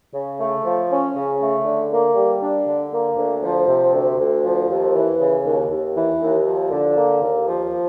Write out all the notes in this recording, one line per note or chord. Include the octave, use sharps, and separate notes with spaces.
C#3
A3
F3
C#4
C#3
A3
D3
A#3
G3
D4
D3
A#3
D2
F3
C3
D2
D2
F3
D#2
E3
C#3
D#2
D#2
E3
D#2
F3
D3
A#3
D#2
F3